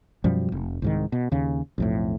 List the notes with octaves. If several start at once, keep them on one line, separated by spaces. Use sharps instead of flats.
F#2 B2 F3 G3
F1
C2 G#2 D#3
B2
D#2 C#3
B1 F2 A2